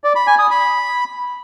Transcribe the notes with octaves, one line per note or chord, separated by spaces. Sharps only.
D5
B5
G#5
D#6
B5